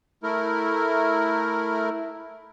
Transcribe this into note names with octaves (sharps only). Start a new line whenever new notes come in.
A3 E4 A#4